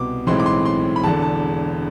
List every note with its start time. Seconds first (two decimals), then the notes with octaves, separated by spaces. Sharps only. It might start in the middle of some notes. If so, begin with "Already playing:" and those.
Already playing: C2 B2 B3 D6
0.27 B1 A2 E3 G#3 C4 C6
0.40 D6
0.46 C6
0.65 C6
0.96 B5
1.04 E1 E2 D3 A5
1.22 A5